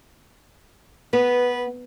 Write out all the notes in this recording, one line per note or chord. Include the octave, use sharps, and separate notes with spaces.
B3 B4